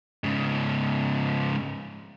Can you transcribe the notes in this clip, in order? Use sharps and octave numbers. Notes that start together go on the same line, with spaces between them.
G#2 C#3